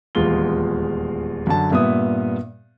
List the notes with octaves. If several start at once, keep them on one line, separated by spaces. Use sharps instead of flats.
D#1 E2 G#3 F4 G7
F#2 D3 A5
G2 A#2 B3 E5 D#6